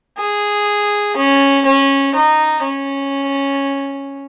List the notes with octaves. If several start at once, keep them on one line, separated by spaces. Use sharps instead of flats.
G#4
C#4
C#4
D#4
C#4